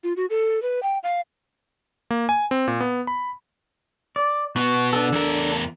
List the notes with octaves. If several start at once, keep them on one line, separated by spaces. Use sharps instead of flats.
F4
F#4
A4
B4
G5
F5
A#3
G#5
C4
A#2
B3
B5
D5
B2 B3 F#4
D4 A4
E2 A#4